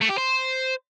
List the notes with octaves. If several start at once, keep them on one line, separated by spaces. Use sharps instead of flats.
A3
G4
C5